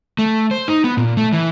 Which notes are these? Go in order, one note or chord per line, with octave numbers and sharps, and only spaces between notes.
A3
C5
D#4
B3
A#2
A3
E3